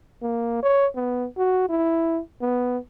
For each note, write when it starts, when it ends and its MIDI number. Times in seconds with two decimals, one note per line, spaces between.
0.22 0.58 58
0.63 0.87 73
0.95 1.26 59
1.37 1.65 66
1.69 2.20 64
2.41 2.78 59